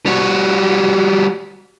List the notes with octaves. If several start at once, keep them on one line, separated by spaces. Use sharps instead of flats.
G3 F#4